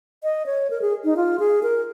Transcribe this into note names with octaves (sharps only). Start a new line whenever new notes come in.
D#5
C#5
A#4
G#4
D#4
F4
G#4
A#4